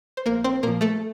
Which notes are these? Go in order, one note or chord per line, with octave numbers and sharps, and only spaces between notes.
C5
A#1 A#3 A#4
C4 C5
A#2 F3 A#3 A#4
A3 A4